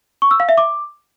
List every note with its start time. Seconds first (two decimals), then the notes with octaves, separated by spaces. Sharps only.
0.22 C#6
0.31 E6
0.40 F5
0.49 E5
0.58 D6